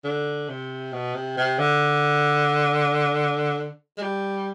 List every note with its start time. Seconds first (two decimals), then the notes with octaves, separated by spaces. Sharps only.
0.04 D3
0.49 C3
0.93 B2
1.15 C3
1.38 C3
1.59 D3
3.98 G#3
4.02 G3